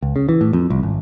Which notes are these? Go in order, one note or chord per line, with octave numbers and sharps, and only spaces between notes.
C#2
C#3
E3
A2
F2
C2
G#1